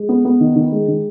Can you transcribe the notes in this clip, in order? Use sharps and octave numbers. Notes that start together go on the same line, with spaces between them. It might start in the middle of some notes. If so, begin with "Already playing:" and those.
Already playing: G#3
B3
B3
D#3
D#3
G#3
D#3